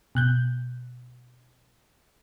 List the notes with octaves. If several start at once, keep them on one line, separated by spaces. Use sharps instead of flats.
B2 F#6 G6